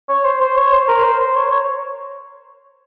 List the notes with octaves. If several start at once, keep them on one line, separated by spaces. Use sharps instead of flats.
C#5
C5
C5
C#5
C5
A#4
C5
C5
C#5
C#5